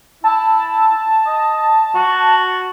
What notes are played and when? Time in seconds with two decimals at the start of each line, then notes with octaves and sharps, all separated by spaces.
0.24 E4 A5
1.27 D#5
1.95 F#4